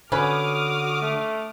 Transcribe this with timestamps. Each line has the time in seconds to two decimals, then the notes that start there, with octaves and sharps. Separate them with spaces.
0.12 D3 C#4 F#4 B4 D6 D#6 F6
1.02 A3